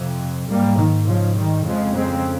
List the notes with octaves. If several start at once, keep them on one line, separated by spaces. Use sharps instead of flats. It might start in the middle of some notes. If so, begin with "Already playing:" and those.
Already playing: F2 C3
G#2 G3 A#3
D#3
C#3 F3
D#3 G3
F2 C#3 F3 G#3
G#3 C4